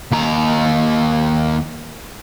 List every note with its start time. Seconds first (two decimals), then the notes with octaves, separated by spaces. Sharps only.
0.12 D#2 A#5